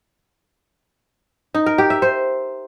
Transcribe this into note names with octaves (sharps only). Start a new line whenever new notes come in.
D#4
A#4
G4
E5
C5